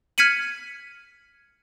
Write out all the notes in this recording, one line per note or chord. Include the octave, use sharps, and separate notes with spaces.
F6 G#6 B6 C#7 D#7 F#7